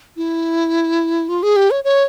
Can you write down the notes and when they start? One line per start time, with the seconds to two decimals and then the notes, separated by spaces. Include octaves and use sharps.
0.17 E4
1.29 F4
1.43 G#4
1.56 G4
1.71 C#5
1.84 C#5